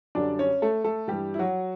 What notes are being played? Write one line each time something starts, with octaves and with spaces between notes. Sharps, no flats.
F#2 D3 G3 D4 D5
C#4 C#5
A3 A4
A3 A4
G2 E3 G3 G4
E4
F#3 F#4